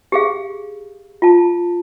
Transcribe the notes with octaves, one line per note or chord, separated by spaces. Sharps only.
G4 G#4 F5
F4 A5